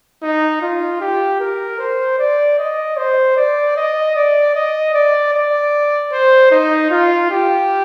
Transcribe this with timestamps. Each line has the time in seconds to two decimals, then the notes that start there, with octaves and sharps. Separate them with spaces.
0.22 D#4
0.62 F4
1.01 G4
1.40 A#4
1.79 C5
2.19 D5
2.59 D#5
2.97 C5
3.37 D5
3.76 D#5
4.15 D5
4.55 D#5
4.94 D5
5.34 D5
6.12 C5
6.51 D#4
6.91 F4
7.31 G4